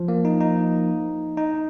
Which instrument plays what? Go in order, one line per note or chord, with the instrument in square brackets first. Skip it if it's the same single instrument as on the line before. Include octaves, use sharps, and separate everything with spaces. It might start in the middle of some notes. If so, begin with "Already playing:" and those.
Already playing: [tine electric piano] F3
A#3
D#4
D#4
D#4